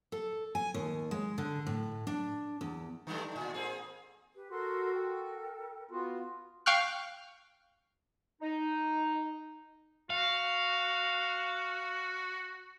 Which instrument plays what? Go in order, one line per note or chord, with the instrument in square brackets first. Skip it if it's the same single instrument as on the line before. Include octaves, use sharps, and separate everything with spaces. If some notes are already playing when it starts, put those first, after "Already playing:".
[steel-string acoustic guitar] A4
G#5
D#2
G#3
D3
A2
D4
E2
[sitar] D3 G3 A3
A2 D#4
A#3 C4 G#4
[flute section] G4 B4
[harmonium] F#4 [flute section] A4 A#4 C6
[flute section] A4 A#4 G5
[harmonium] B3 F4 F#4
[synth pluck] F5 G5 C#6 F6 F#6
[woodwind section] D#4
[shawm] F#4 [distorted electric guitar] F5